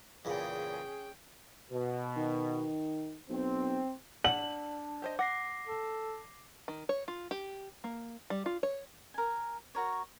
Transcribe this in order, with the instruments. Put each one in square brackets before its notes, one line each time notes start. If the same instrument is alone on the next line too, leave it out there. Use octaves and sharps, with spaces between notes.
[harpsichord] E2 A#2 C#3 [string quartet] C#4 G5 [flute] G#4
[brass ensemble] B2
[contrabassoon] D#3
[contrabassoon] B1 [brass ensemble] C4
[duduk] D4 [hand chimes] D5 [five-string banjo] F#5 [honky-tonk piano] F#7
[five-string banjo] G4 C5 D#5
[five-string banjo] F#5 [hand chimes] D6 A#6 C7
[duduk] A4
[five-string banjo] D#3
C#5
F4
G4
A#3
G3
F4
C#5
[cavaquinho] A#4 G#5
F#4 A#4 C#5